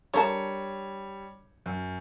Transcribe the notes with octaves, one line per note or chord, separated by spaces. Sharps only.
D3 G3 A#4 C#5 A5
F#2